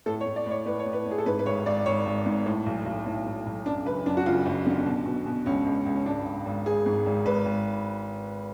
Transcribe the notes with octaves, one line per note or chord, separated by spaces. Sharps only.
A2 A4
C#5
A2
D5
A2 C#5
A2 B4
C#5
A2
B4
A2
G#4
A4
G#2 B4
B4
G#1 C#5
G#1 D5
G#1 C#5
G#1
G#2
A2
B1
B1
A2
A2
B1
F#2 D4
F#1 B4
F#2 D4
F#4
F#1 F4
F#1
D3
B2
B2
B2
C#2 C#4
C#2
C#2
C#4
G#1 D4
G#1
G#1
G#1 G#4
G#2
G#1
G#1 B4
G#1